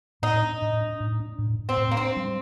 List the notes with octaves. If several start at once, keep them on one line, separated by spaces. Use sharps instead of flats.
A2 D#4
D4
A2
D4
A2
D4
A2
A2
C4
A2
A#3
C4 D4
G3